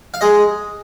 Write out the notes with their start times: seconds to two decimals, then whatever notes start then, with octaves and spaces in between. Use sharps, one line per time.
0.14 F5
0.21 G#3 D#5